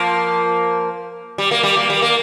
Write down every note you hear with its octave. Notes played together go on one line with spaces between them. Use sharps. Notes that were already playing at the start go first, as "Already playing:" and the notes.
Already playing: F3 A#3
G3
A#3
G3
A#3
G3
A#3